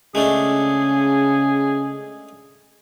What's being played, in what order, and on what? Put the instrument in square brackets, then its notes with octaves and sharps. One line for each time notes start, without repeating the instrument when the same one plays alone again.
[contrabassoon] C#3 [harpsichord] G#3 A3 D4 [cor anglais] G#4